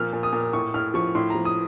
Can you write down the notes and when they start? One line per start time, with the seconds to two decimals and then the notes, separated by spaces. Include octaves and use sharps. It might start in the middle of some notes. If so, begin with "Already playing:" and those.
Already playing: A#2 F3 F6
0.13 A#2
0.23 D#6
0.33 A#2
0.53 A2 C#6
0.74 A2 F6
0.94 F3 C#6
1.15 A2 C6
1.30 F3 A#5
1.45 D#6